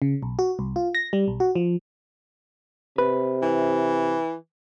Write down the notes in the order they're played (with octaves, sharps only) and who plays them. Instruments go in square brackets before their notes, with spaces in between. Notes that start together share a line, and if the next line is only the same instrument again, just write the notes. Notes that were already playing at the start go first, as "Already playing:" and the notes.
[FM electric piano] C#3
B1
F#4
C2
F4
A#6
G3
B1
F#4
F3
[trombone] C3 [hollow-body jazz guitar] B4
[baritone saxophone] E3